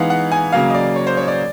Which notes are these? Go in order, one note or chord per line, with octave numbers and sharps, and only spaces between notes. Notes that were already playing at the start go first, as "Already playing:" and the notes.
Already playing: E3 G#3 B3 D#4 F5 F#5
F#5
G#5
C#3 F#3 A#3 F5
D#5
D5
C#5
C5
C#5
D5